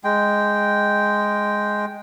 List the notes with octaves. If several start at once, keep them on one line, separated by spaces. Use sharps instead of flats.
G#3 G5